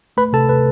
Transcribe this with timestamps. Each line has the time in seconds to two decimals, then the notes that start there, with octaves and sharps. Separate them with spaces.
0.17 A3 B4 B5
0.33 C3 A4 A5
0.49 C3 B4